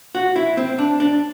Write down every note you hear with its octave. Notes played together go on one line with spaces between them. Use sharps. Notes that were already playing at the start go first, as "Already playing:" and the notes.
F#4
E4
C4
D4
D4